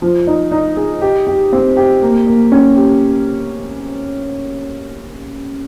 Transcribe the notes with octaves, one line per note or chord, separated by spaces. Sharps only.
F3
D#4
D#4
G#4
G4
G4
C4
G4
A#3
A#3
C#4
G4